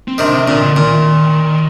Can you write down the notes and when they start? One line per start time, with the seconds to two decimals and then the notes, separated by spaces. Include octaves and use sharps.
0.08 C4
0.18 C3 D#3 D4
0.34 C4
0.48 A#2 D3
0.62 D3
0.76 A#2 D#3